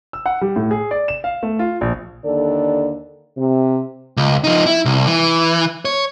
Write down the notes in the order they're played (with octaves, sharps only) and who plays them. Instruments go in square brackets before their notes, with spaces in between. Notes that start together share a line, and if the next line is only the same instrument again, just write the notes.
[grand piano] E6
F#5
G3
A2
G#4
D5
E7
F5
A3
F4
A#1
[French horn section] D#2 D3 A4 D5
C3
[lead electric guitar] C#2
F3 D#4
E4
C2
E3
C#5